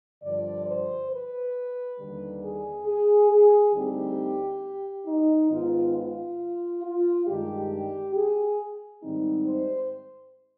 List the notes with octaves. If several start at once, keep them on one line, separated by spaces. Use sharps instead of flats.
G2 D3 F3 D5
C5
B4
D#2 D3 G3
G#4
G#4
G#4
D2 D3 G3 C4 D#4 G4
D#4
G#2 D#3 B3 F4
F4
F4
G2 D#3 G#3 D4 G4
G#4
G#2 D#3 G3 C4 D#4
C5